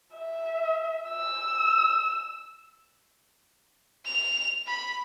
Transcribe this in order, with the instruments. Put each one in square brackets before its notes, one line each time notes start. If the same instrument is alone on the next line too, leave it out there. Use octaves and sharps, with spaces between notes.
[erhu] E5
E6
[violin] F7
B5